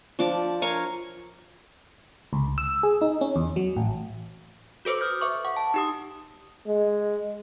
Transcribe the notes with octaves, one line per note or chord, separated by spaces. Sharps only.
F3 D4 D6
A#4 C#5 F5 G#5
C#2
E6
G#4
D#4
C#4
E2
F#3
A1
F#4 A4 B4 C5 D6
D#6 F6 G6
B4 E5 C#6 D6
F#5 C#6
A5
D#4 G4 D#6
G#3